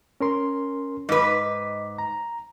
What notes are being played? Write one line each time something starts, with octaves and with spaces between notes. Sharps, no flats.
C#4 A#4 C6
G#2 B4 D#5 D6
A#5